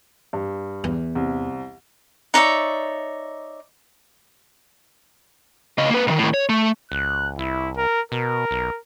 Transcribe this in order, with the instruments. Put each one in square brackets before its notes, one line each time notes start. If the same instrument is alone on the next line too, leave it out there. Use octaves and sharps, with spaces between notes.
[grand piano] G2
[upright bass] E2
[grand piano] C2
[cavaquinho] D#4 C#5 D5 E5
[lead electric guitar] C#3 D#5
A#3 B4
B1 D#3
A2 D#3
C#5
A3
[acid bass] C#2 [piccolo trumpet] F#6
[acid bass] C2 [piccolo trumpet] E4
[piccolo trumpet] A#4
[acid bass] B2 [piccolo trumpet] A#4
[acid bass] B1